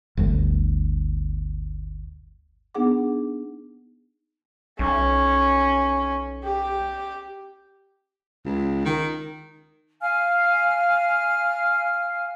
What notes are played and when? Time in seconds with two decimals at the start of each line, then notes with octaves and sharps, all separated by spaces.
0.17 G1 D2
2.75 B3 D4 D#4 G#4 F#5 D6
4.79 B1 C#4
6.44 G4
8.45 C#2
8.85 D#3
10.01 F5 G#5 F6